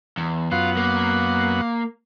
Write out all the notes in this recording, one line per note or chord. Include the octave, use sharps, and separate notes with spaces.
E2
F#2 B3 F4 F#5
A#3